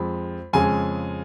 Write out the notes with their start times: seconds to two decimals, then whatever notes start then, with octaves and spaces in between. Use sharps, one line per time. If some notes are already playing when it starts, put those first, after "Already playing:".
Already playing: F2 F3 G#3 B5
0.53 F2 C#3 G#3 G#5